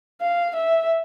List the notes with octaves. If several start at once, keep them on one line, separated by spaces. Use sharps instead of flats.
F5
E5